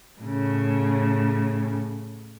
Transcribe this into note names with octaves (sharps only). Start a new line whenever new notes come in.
A2 C#3